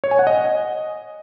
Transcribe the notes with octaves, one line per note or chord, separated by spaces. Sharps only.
C#5
G#5
F#5
D#5